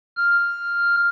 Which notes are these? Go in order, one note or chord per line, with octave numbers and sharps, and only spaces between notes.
F6